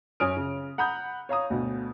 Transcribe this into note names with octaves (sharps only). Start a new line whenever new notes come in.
F#2 C#4 G#5 D#6 F6 D7
C#3
F#5 A#5 B5 D#6 G6
C#5 F5 A#5 D#6
D2 B2